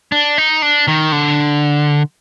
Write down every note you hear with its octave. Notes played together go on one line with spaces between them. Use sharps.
D4
D#4
D4
D#3
D3